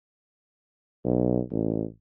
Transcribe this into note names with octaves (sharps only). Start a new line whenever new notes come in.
B1
A1